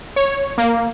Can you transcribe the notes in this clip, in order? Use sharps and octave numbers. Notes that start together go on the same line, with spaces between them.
C#5
A#3